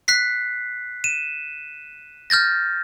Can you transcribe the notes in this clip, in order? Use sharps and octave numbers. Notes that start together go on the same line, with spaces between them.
F#6 B6 C7
D#7 E7
F6 G6 A6 A#6